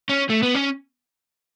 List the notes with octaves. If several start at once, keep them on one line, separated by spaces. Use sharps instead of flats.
C#4
A3
B3
C#4